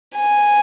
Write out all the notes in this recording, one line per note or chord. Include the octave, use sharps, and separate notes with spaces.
G#5